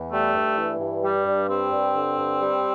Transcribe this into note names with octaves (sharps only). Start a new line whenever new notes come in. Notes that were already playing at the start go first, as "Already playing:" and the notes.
Already playing: E2
G3 A3
G2
E3
G2
G3
G2
G3 C4
G2
D3
G2
G3